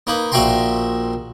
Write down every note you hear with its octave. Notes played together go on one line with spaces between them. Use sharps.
A#3 D#4 B4
A#1 F#4 E5 G5 A#5 C6